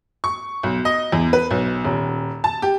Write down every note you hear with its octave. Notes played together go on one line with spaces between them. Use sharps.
C#6
B1
D#5
E2
B4
B1
D#1
A5
G4